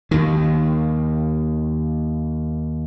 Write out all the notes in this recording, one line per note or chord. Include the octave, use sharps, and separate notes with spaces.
D#2 D#3